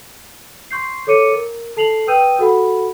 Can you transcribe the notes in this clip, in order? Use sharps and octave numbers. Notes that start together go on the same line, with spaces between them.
C6 C#6 G6 C7
A4 C#5 D6 C#7 D#7
A#4
A4 A5 C7 F7 F#7
B4 G5 D#6 E6 G6 D#7
F#4 A4 F#5 B5